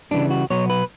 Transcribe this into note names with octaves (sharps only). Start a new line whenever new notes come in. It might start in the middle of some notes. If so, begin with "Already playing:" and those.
C#3 E3 G3 D4
F#4
B2 F#3 B3 C#5
B4